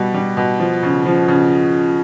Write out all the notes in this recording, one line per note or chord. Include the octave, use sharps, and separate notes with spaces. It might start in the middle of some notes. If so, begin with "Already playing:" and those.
Already playing: B2 G3
G3
B2
F3
C#3
F3
C#3